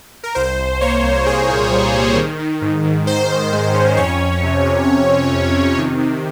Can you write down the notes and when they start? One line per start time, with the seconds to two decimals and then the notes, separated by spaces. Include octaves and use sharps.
0.24 A#4
0.35 C2 C5
0.59 C2
0.81 A#3 C#5
1.03 C2
1.26 A#3 G#4
1.48 A#2
1.71 G3
1.94 A#3
2.16 D#3
2.39 D#3
2.61 G#2
2.84 G#2
3.06 D#3 C5
3.30 D#3
3.53 G#3
3.74 C#4
3.97 F2 C#5
4.20 F2
4.43 C3
4.66 C3
4.89 F2
5.11 C3
5.33 F2
5.55 C3
5.78 D#3
6.01 C3